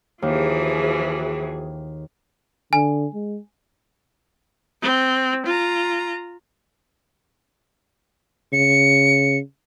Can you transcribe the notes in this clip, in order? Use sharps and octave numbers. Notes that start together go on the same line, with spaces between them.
D#2 E3 F3 F#4 G#4
D3 G#5
G#3
C4
F4 A#5
C#3 C#7